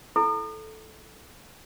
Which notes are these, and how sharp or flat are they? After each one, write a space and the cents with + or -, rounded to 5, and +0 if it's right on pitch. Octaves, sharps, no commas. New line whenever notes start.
E4 +0 A4 -10